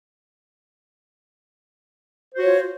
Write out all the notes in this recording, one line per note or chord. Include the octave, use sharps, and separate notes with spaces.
F4 F#4 C5 C#5